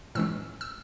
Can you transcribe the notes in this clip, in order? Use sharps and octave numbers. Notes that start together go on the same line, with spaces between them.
A2 E3 G#3 C#4 E6
E6